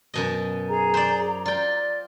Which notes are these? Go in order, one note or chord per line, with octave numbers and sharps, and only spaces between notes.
F#2 B2 D#5
G#4 A#5
C5 D5
F4 D5 G5